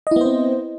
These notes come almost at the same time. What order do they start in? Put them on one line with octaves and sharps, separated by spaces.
D#5 E4 B3 C5 C4